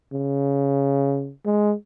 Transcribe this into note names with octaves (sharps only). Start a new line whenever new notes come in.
C#3
G#3